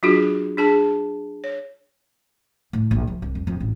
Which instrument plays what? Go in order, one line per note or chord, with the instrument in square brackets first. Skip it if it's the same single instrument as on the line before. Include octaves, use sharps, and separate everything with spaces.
[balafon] F#3 D4 F4 F#4 G#4
D4 G#4 A5
C#5
[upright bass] A2
A#1
F3
C2
F2
F2
A1